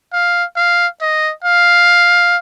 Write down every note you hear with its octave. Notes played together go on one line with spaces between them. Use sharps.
F5
F5
D#5
F5